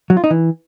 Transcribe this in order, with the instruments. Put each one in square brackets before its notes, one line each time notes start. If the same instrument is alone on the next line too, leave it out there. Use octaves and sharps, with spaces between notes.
[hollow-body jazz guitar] F#3
F4
D#4
E3